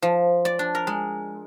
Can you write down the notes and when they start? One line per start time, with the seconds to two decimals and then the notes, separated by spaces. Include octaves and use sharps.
0.02 F3
0.45 D5
0.59 D4
0.75 A#4
0.87 G#3